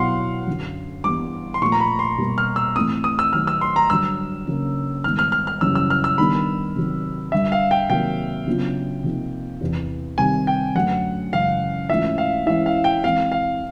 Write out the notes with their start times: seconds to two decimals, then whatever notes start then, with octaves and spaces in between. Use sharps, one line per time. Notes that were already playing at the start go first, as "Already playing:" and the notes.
Already playing: B2 F#3 B3 E4 F5 F#5 C6
0.47 F#2 D3 F#3
1.04 G2 E3 G3 B3 D6
1.54 C6
1.62 A#2 F3 A3 C#6
1.72 A#5
1.80 B5
1.99 C6
2.18 B2 G3 A#3
2.38 F6
2.56 E6
2.76 A2 E3 A3 C4 D#6
3.04 D#6
3.19 E6
3.33 D#3 F#3 A3 F6
3.47 E6
3.61 C6
3.76 A#5
3.90 G2 D3 F#3 E6
4.47 C#3 F#3 A#3 D4
5.04 G#2 D#3 G3 B3 F6
5.19 F6
5.32 F6
5.47 F6
5.61 F#2 C#3 E3 G3 E6
5.75 E6
5.90 F6
6.04 E6
6.18 D#3 G3 B3 D4 B5
6.76 C3 D#3 F#3
7.32 G2 D3 G3 E5
7.52 F5
7.71 G5
7.89 C3 D#3 F#3 A#3 G5
8.47 C#3 F#3 B3 D4 F4
9.04 C3 F3 A#3 D#4
9.61 E2 C3 E3
10.18 C3 D#3 G3 C4 G#5
10.47 G5
10.75 F#2 D3 F#3 A3 F#5
11.32 F#2 C#3 E3 G#3 F5
11.89 G#2 E3 A3 C#4 F4 E5
12.18 F5
12.46 E3 G#3 C#4 E4 E5
12.66 F5
12.84 G5
13.04 E3 G#3 C4 F5
13.32 F5